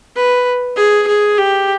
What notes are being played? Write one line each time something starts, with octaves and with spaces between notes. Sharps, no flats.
B4
G#4
G#4
G4